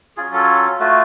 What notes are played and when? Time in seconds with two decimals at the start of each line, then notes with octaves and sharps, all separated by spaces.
0.17 F#3 C#4 F4 G#4
0.34 A4
0.80 A3 F4 F#4